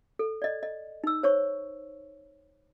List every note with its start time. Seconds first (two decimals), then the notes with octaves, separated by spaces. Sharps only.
0.19 A4
0.42 D5 D#5
0.63 D#5
1.04 D#4 E6
1.23 C5 C#5 C#6